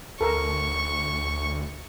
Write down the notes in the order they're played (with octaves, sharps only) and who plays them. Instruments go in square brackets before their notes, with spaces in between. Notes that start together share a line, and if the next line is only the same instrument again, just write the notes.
[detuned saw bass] D2 [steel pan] A4 A#4 [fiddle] C#6